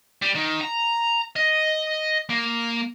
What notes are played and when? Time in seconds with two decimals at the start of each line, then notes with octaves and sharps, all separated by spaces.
0.22 G3
0.35 D#3
0.61 A#5
1.36 D#5
2.30 A#3